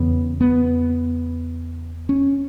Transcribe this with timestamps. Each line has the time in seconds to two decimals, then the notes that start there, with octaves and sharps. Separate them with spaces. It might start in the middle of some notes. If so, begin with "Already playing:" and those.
Already playing: E2 C#3 B3
0.41 B3
2.09 C#4